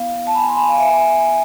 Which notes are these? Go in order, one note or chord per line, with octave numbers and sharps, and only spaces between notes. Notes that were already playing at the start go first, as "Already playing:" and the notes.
Already playing: B3 E4 F5
A5
G#5 B5
C6
G#5 B5
F5
E5 G#5